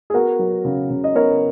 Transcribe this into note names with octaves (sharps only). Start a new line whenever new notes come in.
G#4
B3 F#4 A#4
F#3
C#3
C#3
D#5
B3 A#4 C#5